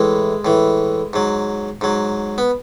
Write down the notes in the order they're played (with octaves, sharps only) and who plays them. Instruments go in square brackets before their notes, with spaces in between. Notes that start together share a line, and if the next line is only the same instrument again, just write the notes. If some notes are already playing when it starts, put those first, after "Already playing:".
Already playing: [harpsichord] A2 E3 G#3
A2 E3
G#2 F#3
G#2 F#3
B3